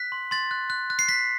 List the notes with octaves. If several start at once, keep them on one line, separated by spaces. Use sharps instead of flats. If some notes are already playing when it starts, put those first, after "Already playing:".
Already playing: F#6 B6
C6
C6 A6
F#6
F#6
F#6
C7
F#6 B6